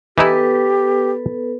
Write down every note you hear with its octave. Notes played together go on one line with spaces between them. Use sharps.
E3 B3 D#4 E4 G4 A4 B4